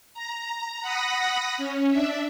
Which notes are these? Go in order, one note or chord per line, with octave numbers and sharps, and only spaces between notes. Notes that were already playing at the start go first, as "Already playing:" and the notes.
A#5
F#5 B5 D#6 A#6
C#4
D4 E5